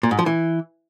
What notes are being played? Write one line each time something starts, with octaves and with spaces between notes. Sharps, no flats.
A#2
G#2
F3
E3